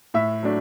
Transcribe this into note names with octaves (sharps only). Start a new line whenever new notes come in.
A2 E5
F#3 A3 D4